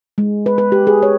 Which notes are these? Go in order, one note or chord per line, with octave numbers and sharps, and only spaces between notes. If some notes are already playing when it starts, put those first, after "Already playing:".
G#3
B4
B4
G4
G#4
C#5